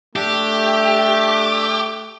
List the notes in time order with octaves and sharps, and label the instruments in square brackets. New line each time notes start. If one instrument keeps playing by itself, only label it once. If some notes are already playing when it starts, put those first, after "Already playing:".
[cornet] A3 [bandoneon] D4 E5 [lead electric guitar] G4